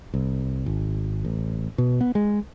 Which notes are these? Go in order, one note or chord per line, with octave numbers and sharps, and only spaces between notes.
C2
G#1
A1
B2
B3
G#3